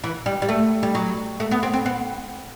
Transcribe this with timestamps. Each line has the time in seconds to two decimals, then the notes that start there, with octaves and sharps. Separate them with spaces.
0.04 E3
0.26 G3
0.42 G3
0.49 A3
0.83 G3
0.95 F#3
1.40 A3
1.51 B3
1.63 C4
1.73 C4
1.86 B3